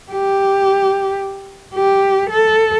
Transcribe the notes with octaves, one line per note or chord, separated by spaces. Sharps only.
G4
G4
A4